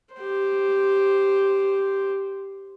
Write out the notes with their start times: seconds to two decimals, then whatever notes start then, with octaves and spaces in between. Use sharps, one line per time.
0.15 G4 C5